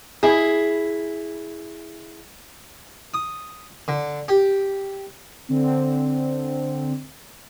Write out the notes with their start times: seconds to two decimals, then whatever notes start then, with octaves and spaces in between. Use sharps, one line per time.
0.23 E4 G#4
3.14 D#6
3.88 D3
4.28 G4
5.49 D3 C4